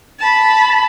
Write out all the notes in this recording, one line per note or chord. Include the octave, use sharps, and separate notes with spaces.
A5 B5